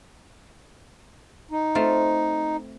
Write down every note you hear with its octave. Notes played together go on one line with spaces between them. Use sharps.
D#4
A3 C4 F4